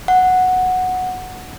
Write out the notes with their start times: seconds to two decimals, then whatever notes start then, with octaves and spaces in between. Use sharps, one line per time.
0.08 F#5